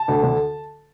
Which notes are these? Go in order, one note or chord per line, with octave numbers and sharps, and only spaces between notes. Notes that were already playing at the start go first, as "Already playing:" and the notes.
Already playing: A5
D2
D3